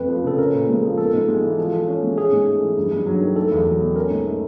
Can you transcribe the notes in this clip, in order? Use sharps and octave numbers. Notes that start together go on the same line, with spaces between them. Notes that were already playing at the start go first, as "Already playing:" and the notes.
Already playing: F2 A3 B4
F3
C#3 A4
C#4 A#4
A#2
G#3
F3
B3 A4
G#2
G#3
E3
F3
F3
C#4
G#3
C#4 G#4
G#2
A3
E3
G2
G2
F#3
D#3
A3 A4
E2
F#3
B2
C#4 A#4
G#2
A3